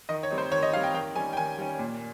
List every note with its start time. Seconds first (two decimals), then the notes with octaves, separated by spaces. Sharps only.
0.09 D#3 D#5
0.23 C#5
0.31 G3 C4 D#4
0.38 C5
0.52 D#3 C#5
0.63 D#5
0.73 G3 C4 D#4 F5
0.83 G5
0.94 D#3 G5
1.16 G3 C#4 G#5
1.33 G5
1.37 D#3 G#5
1.59 G3 C#4
1.79 A#2